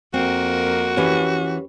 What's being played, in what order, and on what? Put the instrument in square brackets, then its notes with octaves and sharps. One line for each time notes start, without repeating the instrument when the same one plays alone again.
[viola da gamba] F2 A#3 A#4 [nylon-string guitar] C4 [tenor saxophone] F#4
[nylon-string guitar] E3 C#4 [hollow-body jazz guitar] G4 B4 C#5